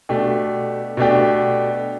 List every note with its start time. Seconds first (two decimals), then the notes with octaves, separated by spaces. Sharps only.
0.09 B2 A3 D4 G4
0.97 B2 A3 D4 G4